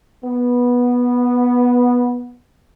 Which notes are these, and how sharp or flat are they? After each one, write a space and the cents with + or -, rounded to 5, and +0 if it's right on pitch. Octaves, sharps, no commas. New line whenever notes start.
B3 -10